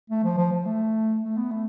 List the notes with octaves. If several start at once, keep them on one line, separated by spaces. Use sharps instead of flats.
A3
F3
F3
F3
A3
A3
B3
A3